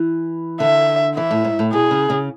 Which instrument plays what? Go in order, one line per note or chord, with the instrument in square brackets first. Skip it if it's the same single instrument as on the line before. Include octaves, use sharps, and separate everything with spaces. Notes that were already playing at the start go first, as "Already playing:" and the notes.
Already playing: [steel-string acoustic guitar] E3
[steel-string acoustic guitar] D3 [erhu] E5
[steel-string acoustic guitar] E3 [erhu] E5
[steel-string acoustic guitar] A2
G#2
A2
[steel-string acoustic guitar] B2 [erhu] G#4
[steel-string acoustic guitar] C#3
C#3